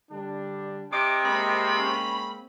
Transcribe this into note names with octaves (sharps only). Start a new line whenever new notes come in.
D3 G3 D4
C3 D#5 D6
G#3 A#3 C4 D#5 B5
C#4